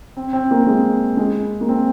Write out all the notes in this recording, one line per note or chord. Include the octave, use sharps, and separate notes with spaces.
C4
C4
A#3
G#3
G#3
A#3
C4